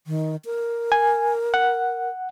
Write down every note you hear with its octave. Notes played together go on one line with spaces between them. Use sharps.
D#3
A#4
G#5
F#5